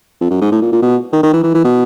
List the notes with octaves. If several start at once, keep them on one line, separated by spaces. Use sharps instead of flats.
F2
F#2
G#2
A2
A#2
A#2
B2
D#3
D#3
E3
E3
E3
B2